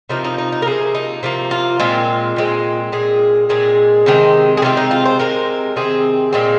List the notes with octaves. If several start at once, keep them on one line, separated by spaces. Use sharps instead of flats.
C3 F3 A#3 D#4
D#4
D#4
D#4
A#4
C3 F3 A#3 G#4
D#4
C3 F3 A#3
F4
A#2 G#3 C4
A#2 G#3 C4
A#2 G#3 C4 G#4
A#2 G#3 C4 G#4
C3 D#3 G#3 C4
G#4
C3 D#3 G#3 C4 F4
D#4
F4
C5
C3 D#3 G#3 C4 A#4
C3 D#3 C4 G#4
A#2 G#3 C4